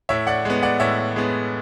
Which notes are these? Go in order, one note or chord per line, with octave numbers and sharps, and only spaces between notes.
A2 C#5 E5
D5 F#5
G#3 B3
D5 F#5
A2 C#5 E5
G#3 B3